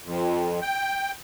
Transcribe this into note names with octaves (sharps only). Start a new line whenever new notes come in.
F2
G5